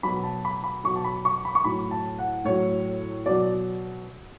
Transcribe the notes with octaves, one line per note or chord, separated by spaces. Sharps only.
B2 F#3 B5
A5
B5
B5
B2 F#3 C#6
A5
B5
C#6
B5
C#6
A2 F#3 B5
A5
F#5
A2 F#3 C#5
B2 F#3 D5